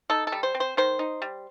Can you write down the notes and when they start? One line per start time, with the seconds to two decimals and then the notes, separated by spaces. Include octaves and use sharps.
0.10 D#4 A4
0.27 A4
0.32 G3
0.43 C5
0.55 C4
0.60 C5
0.77 D#3 C5
0.99 D#4
1.22 G3